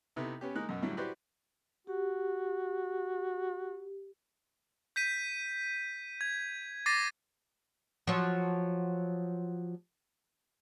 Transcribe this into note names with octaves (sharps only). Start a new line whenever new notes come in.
C3 B3 D#4 E4 A4
B3 C#4 G4
G#3 A#3 D#4 F#6
F#2 B2
A2 D3 F#3 G3 E4 G4
E4 F#4 G4 B4 C5 D5
F#4 G4
G6 B6 D#7
G#6
D6 A6 A#6 C7 D#7
F3 F#3